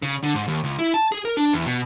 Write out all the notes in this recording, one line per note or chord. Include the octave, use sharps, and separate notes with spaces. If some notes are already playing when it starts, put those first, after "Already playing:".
C#3
D3
G#2
D#2
C#2
E4
A5
G#4
A#4
D4
E2
B2